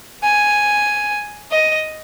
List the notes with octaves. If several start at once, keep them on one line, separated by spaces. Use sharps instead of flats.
G#5
D#5